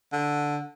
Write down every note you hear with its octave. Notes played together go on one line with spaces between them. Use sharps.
D3